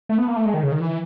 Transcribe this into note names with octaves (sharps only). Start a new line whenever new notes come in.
A3
B3
A#3
A3
G#3
D#3
C#3
D#3
E3